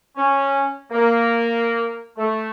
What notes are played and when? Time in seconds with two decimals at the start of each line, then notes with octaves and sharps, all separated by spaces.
0.17 C#4
0.92 A#3
2.18 A3